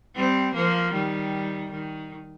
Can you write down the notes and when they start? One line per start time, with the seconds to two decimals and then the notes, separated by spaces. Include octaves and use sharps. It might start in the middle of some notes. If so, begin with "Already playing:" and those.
0.15 G3 C4
0.54 F3 A#3
0.93 D#3 G3
1.71 D#3